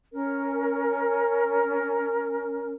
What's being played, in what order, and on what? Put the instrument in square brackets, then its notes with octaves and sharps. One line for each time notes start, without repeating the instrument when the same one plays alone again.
[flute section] C#4 A#4